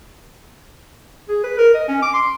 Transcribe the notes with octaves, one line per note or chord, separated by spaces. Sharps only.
G#4
B4
A#4
D#5
C#4
D6
C6